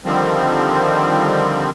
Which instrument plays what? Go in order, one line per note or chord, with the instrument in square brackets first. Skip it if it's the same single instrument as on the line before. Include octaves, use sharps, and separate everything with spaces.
[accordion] D3 D#3 F3 G3 C4